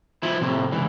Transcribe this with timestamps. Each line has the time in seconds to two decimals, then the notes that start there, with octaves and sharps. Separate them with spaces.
0.23 F3 E4
0.41 A2 C3
0.72 C#2 E3